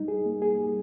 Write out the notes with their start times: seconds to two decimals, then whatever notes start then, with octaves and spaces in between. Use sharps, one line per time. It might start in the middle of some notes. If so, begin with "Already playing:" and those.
Already playing: G3 D#4
0.08 G#4
0.26 A#3
0.42 G#4
0.57 G3